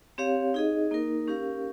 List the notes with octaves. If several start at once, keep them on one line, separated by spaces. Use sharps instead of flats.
C4 G4 C#5 F5
D#4 G#4 D#5
A#3 D#4 A#4
C#4 G4 A#4 F5